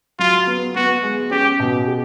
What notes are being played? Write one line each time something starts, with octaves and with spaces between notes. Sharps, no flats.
F#3 F4
B3
B3 F#4
G#3
C#4 G4
B2
G4